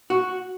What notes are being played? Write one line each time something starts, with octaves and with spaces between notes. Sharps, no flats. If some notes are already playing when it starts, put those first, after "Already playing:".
F#4